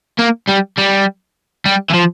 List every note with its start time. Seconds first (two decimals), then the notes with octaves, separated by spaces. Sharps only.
0.19 A#3
0.49 G3
0.78 G3
1.66 G3
1.90 E3
1.94 F3